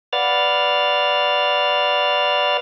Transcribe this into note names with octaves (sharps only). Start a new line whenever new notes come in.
B4 D5 F5 F#5 F6 A6